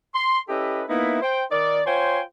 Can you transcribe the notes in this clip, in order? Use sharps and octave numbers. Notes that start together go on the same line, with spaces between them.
C6
C#4 E4 G4 A4 B4 D#5
A#3 B3 D#4 E4
C5 G5
D#3 D#4 A#4 D5
F4 C5 C#5 G5 G#5 C6